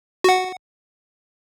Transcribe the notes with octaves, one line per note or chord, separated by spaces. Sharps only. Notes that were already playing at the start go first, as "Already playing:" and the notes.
F#4 F#5